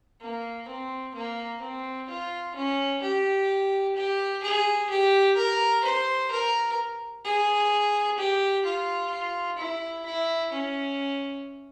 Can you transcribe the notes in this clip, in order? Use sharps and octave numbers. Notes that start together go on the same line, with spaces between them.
A#3
C4
A#3
C4
F4
C#4
G4
G4
G#4
G4
A#4
C5
A#4
G#4
G4
F4
E4
E4
C#4